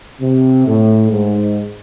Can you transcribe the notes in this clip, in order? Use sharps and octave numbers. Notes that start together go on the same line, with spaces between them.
C3
A2
G#2